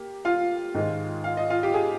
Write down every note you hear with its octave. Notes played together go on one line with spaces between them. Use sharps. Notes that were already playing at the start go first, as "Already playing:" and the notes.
Already playing: A#3 G4
F4 F5
G#2 D#3 G#3 D#4
F5
D#5
F4 F5
G4
G#4